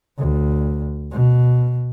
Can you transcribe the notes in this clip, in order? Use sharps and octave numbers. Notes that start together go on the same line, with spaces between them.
D2
B2